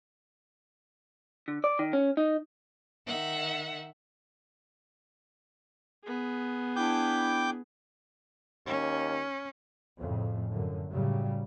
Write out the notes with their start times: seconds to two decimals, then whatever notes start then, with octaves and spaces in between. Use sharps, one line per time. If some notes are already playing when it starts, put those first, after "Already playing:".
1.48 D3
1.64 D5
1.79 D#3
1.93 C#4
2.17 D#4
3.08 D#3 E5 F#5
6.05 B3 G#4
6.76 D4 E4 G5 D6 G6
8.66 D#2 C#4
9.99 F2 A2 C#3
10.52 F#2 A2 D3
10.92 A2 C#3 F#3 G3